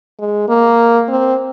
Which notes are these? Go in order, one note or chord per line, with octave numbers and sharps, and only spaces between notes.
G#3
A#3
C4